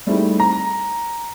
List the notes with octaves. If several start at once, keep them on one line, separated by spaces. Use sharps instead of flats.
G3 A3 C4 D#4 E4 G#4
A#5